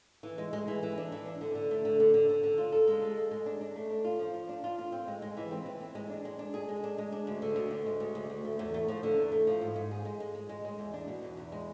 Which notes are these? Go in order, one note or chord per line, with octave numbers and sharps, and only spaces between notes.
E3
G#3
G#3
E3
E3
D4
E3
D4
D3
D3
A3
D3
D3
D3
D3
D3
F4
A4
G#3
A4
G#3
G#3
D4
D4
A3
D4
F4
F3
F4
D4
F4
F4
C4
G#3
G#3
E3
C4
E3
C4
G#3
D4
G#3
D4
G#4
G#3
D4
G#3
D4
D2
D3
D2
D2
G#3
D2
D2
D2
A3
E2
A3
F3
D3
E2
A3
F3
G#2
G#2
G#4
G#3
G#3
G#3
G#3
G#3
E2
D4
B2
E2
E2
G#3